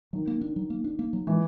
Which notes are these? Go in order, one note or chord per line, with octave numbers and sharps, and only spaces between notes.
D#3 F#3
A#3
D4
F#3
A#3
D4
A#3
F#3
E3 G#3